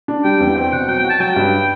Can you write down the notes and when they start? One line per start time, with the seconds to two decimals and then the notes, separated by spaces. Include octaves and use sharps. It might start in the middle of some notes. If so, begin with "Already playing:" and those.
0.08 D4
0.24 G3 G5
0.40 E2
0.56 C4 G5
0.72 B2 F#5
0.88 F#3 G5
0.99 G5
1.04 F#4
1.10 A5
1.20 F#3 G5
1.36 G2